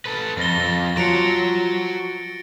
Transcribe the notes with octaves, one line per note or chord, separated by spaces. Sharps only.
A4 B4
F2 A6 A#6 G7
F2
F3 F#3 F4 F#4 A#5 C#7 D7